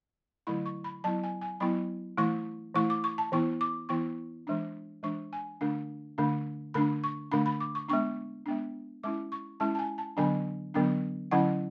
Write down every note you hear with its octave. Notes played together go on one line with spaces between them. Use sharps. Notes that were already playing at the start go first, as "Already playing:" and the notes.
D3 F#3 A3 E4 B5
C#6
B5
F#3 B3 E4 A5
G#5
G#5
F#3 B3 E4 B5
E3 A3 E4 C#6
E3 A3 E4 C#6
D6
C#6
A5
E3 B3 E4 C#6
D6
E3 B3 E4 C#6
E3 G#3 D4
E3 G#3 D4 C#6
G#5
D3 A3 D4
D3 A3 D4
D3 A3 D4 B5
C#6
D3 A3 D4 B5
B5
D6
C#6
G#3 B3 D4 C#6
G#3 B3 D4
G#3 C#4 E4 D6
C#6
G#3 C#4 E4 A5
A5
G#5
A5
D3 F#3 B3 D4 G#5
D3 F#3 B3 D4
D3 F#3 C#4 E4 F#5